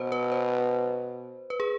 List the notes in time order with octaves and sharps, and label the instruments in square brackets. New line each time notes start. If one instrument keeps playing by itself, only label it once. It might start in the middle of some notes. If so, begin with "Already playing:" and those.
Already playing: [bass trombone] B2 [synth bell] B4 C5
[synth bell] B4
C5
B4
G#4